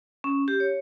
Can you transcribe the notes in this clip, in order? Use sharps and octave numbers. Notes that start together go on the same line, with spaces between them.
C#4
G4
C#5